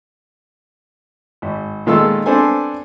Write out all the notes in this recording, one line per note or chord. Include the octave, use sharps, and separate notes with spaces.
G#1
A#2 D#3 G#3 F4 A4 E6
B3 C4 D4 A4 C5 G#5